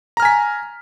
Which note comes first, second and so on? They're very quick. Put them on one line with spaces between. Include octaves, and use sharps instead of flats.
A#5 F6 G#5 B6